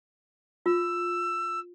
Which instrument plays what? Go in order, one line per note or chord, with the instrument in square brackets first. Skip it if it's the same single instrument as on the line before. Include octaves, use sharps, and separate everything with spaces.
[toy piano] F4 [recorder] E6